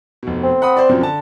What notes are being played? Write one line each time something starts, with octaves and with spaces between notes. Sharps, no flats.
F1 B2
C4
F#5 B5 D#6
C5 D5
F#2 C3 F3
D3 A5